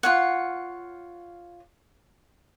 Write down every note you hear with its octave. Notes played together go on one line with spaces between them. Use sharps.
F4 C#5 F#5